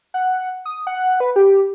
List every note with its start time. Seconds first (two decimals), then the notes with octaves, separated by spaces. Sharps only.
0.14 F#5
0.66 D#6
0.87 F#5
1.20 B4
1.36 G4